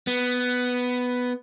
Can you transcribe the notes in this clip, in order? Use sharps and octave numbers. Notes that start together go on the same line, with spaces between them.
B3